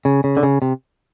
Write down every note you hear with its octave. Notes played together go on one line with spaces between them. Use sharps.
C#3
C#3
D3
C#3
C3